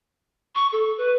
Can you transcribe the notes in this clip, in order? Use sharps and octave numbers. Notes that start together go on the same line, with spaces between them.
C#6
A4
B4